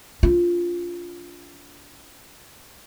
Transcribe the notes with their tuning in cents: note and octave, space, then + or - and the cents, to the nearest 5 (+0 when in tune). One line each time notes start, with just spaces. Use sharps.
D4 -40 F4 +0